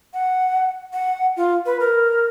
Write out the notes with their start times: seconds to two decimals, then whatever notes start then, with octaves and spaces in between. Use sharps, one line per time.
0.14 F#5
0.93 F#5
1.37 F4
1.66 B4
1.80 A#4